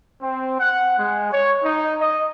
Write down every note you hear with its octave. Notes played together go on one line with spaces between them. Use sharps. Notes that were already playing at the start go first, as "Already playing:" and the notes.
C4
F#5
G#3
C#5
D#4
D#5